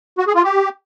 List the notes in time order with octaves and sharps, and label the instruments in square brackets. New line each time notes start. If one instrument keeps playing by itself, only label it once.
[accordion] F#4
G#4
F4
G4